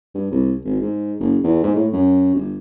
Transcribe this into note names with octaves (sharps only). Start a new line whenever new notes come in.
G2
C2
G#1
G#2
F#1
E2
G#2
A2
F#2
G1